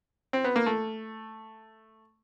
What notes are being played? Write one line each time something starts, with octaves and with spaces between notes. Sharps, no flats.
C4
B3
A#3
A3